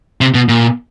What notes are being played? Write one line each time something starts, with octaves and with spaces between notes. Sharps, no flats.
C3
B2
A#2